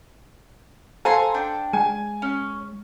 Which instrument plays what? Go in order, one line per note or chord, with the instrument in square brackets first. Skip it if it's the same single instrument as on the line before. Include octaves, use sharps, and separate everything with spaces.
[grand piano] A4 [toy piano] C5 F5 [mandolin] G#5 A#5 C6
[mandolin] D4 G5
[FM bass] G#3 [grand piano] G#5
[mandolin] C#4